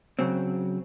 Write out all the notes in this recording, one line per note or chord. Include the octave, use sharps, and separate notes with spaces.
C#3 F#3 C4